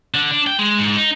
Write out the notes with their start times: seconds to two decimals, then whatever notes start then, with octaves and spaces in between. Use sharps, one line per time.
0.14 D3
0.31 D4
0.47 G5
0.59 G#3
0.78 G#2
0.96 D#4